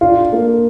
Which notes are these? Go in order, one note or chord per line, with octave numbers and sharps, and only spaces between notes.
D4 F4
A#3